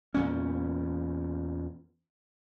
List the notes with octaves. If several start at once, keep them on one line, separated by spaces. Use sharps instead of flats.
E2 A#2 C#4